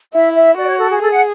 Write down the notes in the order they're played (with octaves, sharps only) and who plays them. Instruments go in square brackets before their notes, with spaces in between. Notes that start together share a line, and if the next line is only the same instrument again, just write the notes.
[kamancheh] E4 [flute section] E5
[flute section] E5
[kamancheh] F#4 [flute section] D5
[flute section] C#5
A4
G#4
[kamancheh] G#4 [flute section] A4
[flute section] F#5